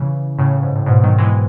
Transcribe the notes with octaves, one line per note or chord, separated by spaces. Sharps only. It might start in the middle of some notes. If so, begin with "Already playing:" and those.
Already playing: C#3 E3
A2 C#3
A2
G#2
A2
G#2 B2
D#3 F#3
E3 G#3